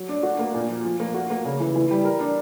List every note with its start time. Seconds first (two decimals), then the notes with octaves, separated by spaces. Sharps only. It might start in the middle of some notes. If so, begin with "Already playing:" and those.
Already playing: F#3
0.09 D4
0.23 F#4
0.39 A#3
0.54 A#2
0.69 F3
0.84 F3
1.00 A#3
1.14 F#4
1.30 A#3
1.45 C#3
1.60 E3
1.76 E3
1.91 G3
2.05 A#4
2.20 D4